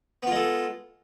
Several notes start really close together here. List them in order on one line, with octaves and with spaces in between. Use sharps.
B3 F4 G#3 A4